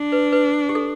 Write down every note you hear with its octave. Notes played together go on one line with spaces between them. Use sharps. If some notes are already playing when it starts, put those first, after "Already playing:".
Already playing: D4
B4
B4
G4
A4